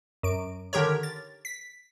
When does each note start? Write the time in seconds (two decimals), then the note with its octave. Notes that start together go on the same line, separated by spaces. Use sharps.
0.23 F#2 D7
0.73 D3 D#3 G4 A#4 C#5
1.03 A6
1.45 B6